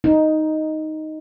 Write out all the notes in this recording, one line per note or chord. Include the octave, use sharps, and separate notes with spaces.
D#4